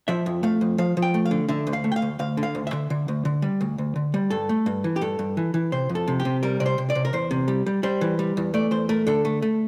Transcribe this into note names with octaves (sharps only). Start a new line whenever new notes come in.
F3 E5
F2
A3 F5
F2
F3 F5
F3
G5
A3
F5
D3
D3 E5
D2
F5
A3
G5
F5
D2
D2 F5
D3
F5
D2
E5
D3
D3
D2
D3
G3
D2
D2
D3
G3
G2 A4
A3
G2
E3
G4
G2 A4
G2
E3
E3
C3 C5
F2
A4
C3
G4
C3
G3 A#4
C3 D5
C5
C3
D5
C3
A#4
E2 C5
C3
G3
G3
G3 C5
E3
G3
E2
A3 D5
E2 C5
A3 A#4
D3 A4
A3
A3